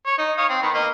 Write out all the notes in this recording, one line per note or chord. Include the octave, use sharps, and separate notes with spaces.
C#5
D#4
C#5 F5 D#6
C4
D#3 B3
A#3 D#5